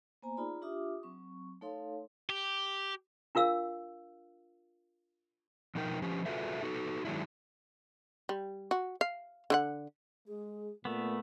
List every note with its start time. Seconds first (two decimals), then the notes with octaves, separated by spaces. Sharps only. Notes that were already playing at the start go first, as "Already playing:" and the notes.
0.23 A#3 B3 C5 G#5 A#5
0.37 D#4 F4 G#4 D5 A#5 B5
0.62 D4 F4 G4 E5 D6 D#6
1.03 F#3 C4 C#6
1.61 A3 D#4 A4 C#5 F5 C6
2.30 G4
3.35 D4 F4 A#4 F5 E6
5.75 B2 F3 D#4 A#4 G5
6.02 F3 C#4 G4
6.26 F4 F#4 G#4 A4 B4 E5
6.63 D#4 F#4 A4
7.05 D#3 F#3 G#3 D4 E4
8.29 G3
8.71 F#4
9.01 F5
9.50 D3 F#4 F#5
10.28 G#3 G#4
10.85 A#2 A3 B3 A#4